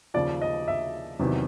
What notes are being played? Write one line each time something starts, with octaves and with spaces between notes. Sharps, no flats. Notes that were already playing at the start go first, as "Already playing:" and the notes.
D#2 C#3 F3 D5
D#5
E5
E2 C3 D#3 F#3